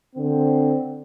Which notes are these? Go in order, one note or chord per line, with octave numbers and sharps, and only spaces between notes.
D3 C4